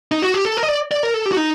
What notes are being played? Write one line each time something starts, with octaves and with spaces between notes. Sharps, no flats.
D#4
F#4
G4
A4
A#4
D#5
D5
D5
A#4
A4
G4
F#4
D#4